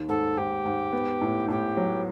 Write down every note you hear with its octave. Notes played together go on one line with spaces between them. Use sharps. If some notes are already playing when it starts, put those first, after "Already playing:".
Already playing: D#2 D#3
G#2 A4
G#2 G4
G#2
B3
A2
A2 G4
F#3